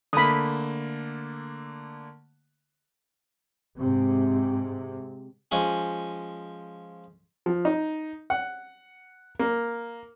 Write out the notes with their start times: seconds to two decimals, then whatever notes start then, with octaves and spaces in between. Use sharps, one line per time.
0.13 D3 A3 A#3 B5 D#6
3.77 G#2 C3
5.51 F3 G#3 C#4
7.46 F3
7.65 D#4
8.30 F#5
9.39 A#3